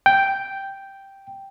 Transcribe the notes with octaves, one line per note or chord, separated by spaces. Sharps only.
G5